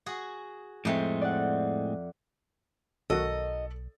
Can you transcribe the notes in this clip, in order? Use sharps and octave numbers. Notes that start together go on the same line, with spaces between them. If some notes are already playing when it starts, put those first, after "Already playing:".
F#4 G#4
F2 A2 G#3 A3 C4
D5 F#5
B1 D#3 F#4 A4 A#4 D#5